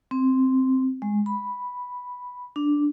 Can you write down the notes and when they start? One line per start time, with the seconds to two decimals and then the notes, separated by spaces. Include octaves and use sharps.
0.11 C4
1.02 G#3
1.26 B5
2.56 D4